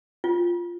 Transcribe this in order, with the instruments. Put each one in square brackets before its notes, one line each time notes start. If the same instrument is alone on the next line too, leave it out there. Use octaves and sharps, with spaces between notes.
[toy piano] F4